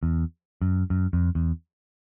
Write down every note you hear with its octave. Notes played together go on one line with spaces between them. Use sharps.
E2
F#2
F#2
F2
E2